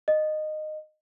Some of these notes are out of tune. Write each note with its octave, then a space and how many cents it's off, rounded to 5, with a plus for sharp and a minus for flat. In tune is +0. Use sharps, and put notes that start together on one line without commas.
D#5 -15